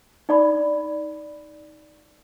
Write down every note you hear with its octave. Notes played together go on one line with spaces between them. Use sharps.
D#4 D5 B5